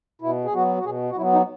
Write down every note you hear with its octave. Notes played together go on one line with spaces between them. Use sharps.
B2 E4
G#4
F#3 B3 F#4
F#4
B2 G#4
F#4
F#3 B3 E4
D#4